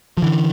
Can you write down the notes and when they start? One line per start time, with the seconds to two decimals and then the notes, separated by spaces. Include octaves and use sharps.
0.17 F3
0.22 D3 E3